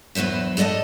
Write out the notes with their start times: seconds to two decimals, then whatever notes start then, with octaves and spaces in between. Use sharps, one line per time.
0.15 E2 F#3 B4 C5 E5
0.57 F#3 A4 D5 D#5 A5